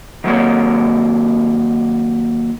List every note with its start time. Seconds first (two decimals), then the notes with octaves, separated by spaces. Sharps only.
0.24 D#3 F#3 A#3 C#5